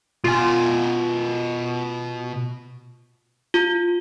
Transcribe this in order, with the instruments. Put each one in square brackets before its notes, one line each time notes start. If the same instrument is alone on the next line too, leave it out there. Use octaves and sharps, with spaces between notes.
[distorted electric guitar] B2 G#5 [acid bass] F4
[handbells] F4